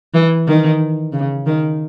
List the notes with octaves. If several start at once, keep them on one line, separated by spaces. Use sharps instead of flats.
E3
D#3
C#3
D#3